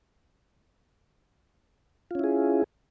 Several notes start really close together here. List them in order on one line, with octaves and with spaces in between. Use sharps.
F4 C#4 E4 G#4